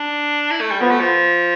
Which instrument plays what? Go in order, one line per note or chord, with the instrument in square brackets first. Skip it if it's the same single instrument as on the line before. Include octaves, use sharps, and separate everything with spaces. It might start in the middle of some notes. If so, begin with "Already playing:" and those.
Already playing: [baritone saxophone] D4
E4
A3
G3
[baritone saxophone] F3 [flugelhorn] B3
[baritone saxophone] A3
F3